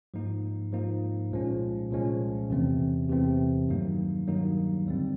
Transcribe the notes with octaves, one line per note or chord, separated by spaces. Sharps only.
G#2 F3 A#3 D#4
G#2 F3 A#3 D#4
C2 A#2 F3 G#3 C#4
C2 A#2 F3 G#3 C#4
E2 C3 E3 A3 C4
E2 C3 E3 A3 C4
G2 D#3 F#3 A#3 D#4
G2 D#3 F#3 A#3 D#4
D#2 D3 G3 C4